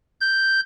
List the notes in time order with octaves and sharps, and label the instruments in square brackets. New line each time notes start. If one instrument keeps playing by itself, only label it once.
[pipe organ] G6